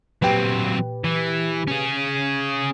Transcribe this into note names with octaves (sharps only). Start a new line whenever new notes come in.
A#2 F#3 C4 G4 B4
E3
C#4 G#4